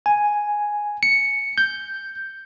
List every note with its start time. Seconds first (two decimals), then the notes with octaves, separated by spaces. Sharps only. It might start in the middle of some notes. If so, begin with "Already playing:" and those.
0.06 G#5
1.03 C#7
1.58 G6